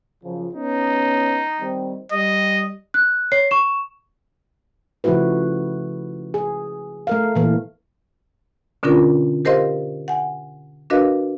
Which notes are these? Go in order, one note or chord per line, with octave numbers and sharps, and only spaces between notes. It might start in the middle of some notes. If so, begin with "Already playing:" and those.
F#2 C#3 F3
B3 C#4 D#4
D#3 G3 C4
G3 D#5
F#6
C#5 C7
C#6 E7
C#3 F3 A3 E4 F#4 B4
G#4
A3 A#4 F5
A#2 E3
B2 D3 C#4 D4 F4 A#4
G4 A#4 C5 D#5 F5 C6
F#5 G#5
D4 F#4 A#4 B4 D#5 F5